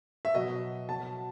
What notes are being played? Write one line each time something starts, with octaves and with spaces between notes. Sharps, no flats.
E5
B2 F#3 D#5
B2 F#3 A5